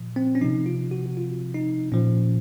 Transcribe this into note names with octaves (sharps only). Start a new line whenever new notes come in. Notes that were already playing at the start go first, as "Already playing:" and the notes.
Already playing: A#2 F3
C4
C#4
C3 F3 D#4
F4
F#4
F#4
F4
D#4
A#2 F3 C#4